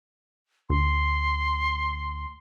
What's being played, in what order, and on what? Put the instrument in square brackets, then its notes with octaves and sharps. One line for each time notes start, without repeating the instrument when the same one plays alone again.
[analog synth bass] D2 [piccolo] C6